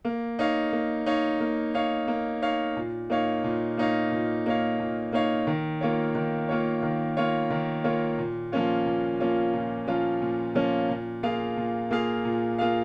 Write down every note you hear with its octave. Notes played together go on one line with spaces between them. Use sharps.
A#3
D#4 C#5 F5
A#3
D#4 C#5 F5
A#3
D#4 C#5 F5
A#3
D#4 C#5 F5
A#2
A#3 D#4 C#5 F5
A#2
A#3 D#4 C#5 F5
A#2
A#3 D#4 C#5 F5
A#2
A#3 D#4 C#5 F5
D#3
A#3 F4 C#5
D#3
A#3 F4 C#5
D#3
A#3 F4 C#5
D#3
A#3 F4 C#5
A#2
F3 A#3 C#4 F4
A#2
F3 A#3 C#4 F4
A#2
F3 A#3 C#4 F4
A#2
F3 A#3 C#4 F4
A#2
A#3 F4 G#4 F5
A#2
A#3 F4 G#4 F5
A#2
A#3 F4 G#4 F5